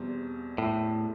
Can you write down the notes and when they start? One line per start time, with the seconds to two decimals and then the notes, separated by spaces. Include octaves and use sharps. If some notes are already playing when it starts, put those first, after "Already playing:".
Already playing: E2 B2 G3 C4
0.58 A2